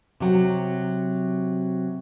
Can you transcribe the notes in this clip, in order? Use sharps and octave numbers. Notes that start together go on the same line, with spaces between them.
C3 F#3